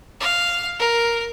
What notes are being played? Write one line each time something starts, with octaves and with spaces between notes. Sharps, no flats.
F5
A#4